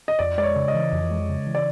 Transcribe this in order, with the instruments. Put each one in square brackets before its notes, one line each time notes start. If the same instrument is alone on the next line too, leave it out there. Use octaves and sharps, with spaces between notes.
[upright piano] D#5
[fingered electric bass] F2 [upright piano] D5
[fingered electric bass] G#3 [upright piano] D5
[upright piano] C#5
[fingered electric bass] C#3
[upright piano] D#5
[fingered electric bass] E3
F2
G#3
C#3
E3
[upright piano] D5